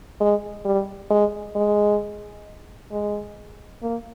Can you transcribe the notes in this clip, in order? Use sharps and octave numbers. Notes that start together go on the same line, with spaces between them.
G#3
G3
G#3
G#3
G#3
A#3